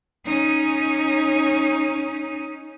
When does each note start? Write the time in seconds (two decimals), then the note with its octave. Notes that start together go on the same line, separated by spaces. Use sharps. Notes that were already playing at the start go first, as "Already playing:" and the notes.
0.25 C#4 D#4